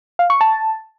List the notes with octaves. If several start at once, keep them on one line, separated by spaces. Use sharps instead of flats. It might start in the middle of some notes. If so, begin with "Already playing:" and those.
F5
C#6
A5